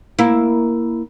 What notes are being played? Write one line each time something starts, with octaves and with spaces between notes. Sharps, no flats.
A#3 E4